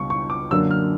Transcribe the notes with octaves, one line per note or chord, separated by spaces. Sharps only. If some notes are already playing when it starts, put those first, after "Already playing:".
Already playing: C#2 B2 G3 C#6
C#6
D6
F#2 D3 F#3 A#3 D4 E6
F6